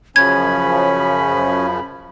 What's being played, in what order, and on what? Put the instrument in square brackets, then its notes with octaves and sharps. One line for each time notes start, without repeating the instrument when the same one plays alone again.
[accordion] F#2 C#3 F3 [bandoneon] C#4 [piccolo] B5 [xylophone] G#6